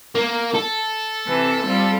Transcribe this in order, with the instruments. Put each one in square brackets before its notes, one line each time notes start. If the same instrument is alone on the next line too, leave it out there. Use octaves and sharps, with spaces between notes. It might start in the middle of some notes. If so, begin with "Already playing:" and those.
[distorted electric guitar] A#3
A4
[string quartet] C3 E3
G3 C4 F4